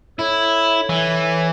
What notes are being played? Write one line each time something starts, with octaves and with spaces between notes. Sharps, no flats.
E4 A4 C#5
E3